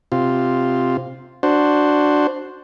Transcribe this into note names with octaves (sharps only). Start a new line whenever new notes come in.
C3 F4
D4 F#4 C5